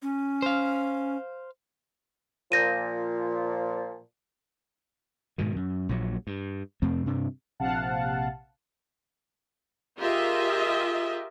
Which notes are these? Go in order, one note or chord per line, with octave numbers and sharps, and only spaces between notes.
C#4
C5 F5
A#2 F3 G6 A#6 D#7
G#2 B2 D#3
F#2
A#1 A#2 D#3 F#3
G2
F2 C3 A3 C4
G2 C3 D4
A#1 C3 F5 F#5 A5
F4 G4 G#4 A#4 D#5 E5